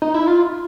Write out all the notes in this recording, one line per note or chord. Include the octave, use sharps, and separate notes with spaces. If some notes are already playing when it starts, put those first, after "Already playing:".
D#4
E4
F4